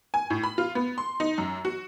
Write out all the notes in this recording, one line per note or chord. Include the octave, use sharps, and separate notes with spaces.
G#5
A2
B5
F4
B3
C6
D#4
F#2
F#4